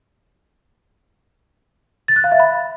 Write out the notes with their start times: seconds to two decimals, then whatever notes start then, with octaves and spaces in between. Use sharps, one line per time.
2.08 A6
2.16 F#6
2.24 F5
2.32 E5
2.40 B5